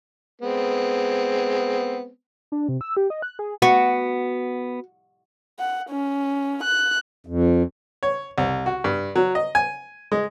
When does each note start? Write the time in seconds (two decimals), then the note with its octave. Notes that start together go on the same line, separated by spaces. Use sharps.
0.41 G#3 B3 C4
2.52 D4
2.69 C3
2.81 E6
2.97 G4
3.10 D#5
3.22 F#6
3.39 G#4
3.62 B3 F#4
5.59 F#5
5.90 C#4
6.63 F#6
7.27 F2
8.03 C#5
8.38 C2
8.66 F#4
8.84 G2
9.16 F#3
9.35 D#5
9.55 G#5
10.12 G#3